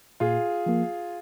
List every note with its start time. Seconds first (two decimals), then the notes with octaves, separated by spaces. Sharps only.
0.20 A#2 F4 G#4
0.66 F3 A#3